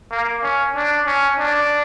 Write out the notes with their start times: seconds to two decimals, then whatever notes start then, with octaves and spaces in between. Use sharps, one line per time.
0.12 A#3
0.43 C#4
0.75 D4
1.06 C#4
1.39 D4